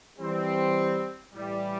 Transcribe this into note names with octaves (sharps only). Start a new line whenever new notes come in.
E3 G3 C4
A2 E3 G3